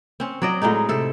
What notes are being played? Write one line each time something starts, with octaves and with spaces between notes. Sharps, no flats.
C4 C#4
F#3 D5 D#5
A2 F#3 G#3 D#4
C3 A4